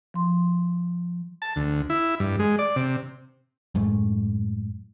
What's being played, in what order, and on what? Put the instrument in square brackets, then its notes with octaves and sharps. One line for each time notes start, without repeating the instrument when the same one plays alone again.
[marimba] F3 C6
[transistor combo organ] A5
D2
E4
G2
G#3
D5
C3
[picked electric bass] F#2 A2 G#3 A3